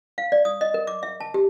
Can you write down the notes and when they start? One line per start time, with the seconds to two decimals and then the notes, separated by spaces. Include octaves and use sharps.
0.18 F5
0.32 D5
0.45 D#6
0.61 D#5
0.74 A#4
0.87 D6
1.03 E5
1.20 A5
1.34 G4